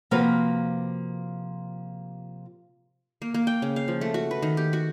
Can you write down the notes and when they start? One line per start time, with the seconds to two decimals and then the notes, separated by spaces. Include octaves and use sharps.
0.11 C3 F3 A#3 F4 F#4 B4
3.22 A#3
3.34 A#3
3.47 G5
3.62 C#3
3.76 F5
3.88 F3
4.01 A3
4.14 F#4
4.31 B4
4.42 D#3
4.57 G4
4.73 F#4